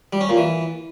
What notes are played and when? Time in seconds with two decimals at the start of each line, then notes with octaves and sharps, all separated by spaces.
0.13 G3
0.21 C#4
0.29 A#2
0.37 E3